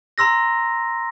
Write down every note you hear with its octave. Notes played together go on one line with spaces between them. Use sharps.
A#5 C6 E6 A#6